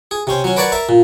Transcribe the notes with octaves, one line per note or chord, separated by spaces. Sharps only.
G#4
C3 C#4 C5
F#3 C#4
A#4 B4 C#5 D5 F#5 A5
A#4 E5 A5
A#2